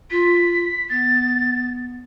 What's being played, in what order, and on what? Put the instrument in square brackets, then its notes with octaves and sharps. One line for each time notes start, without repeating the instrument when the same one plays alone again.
[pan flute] F4 [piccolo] B6
[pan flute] B3 [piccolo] A6